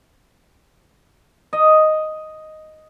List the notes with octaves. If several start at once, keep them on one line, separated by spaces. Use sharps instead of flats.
D#5